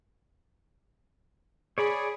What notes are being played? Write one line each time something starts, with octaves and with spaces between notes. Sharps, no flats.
G#4 C#5 D5 B5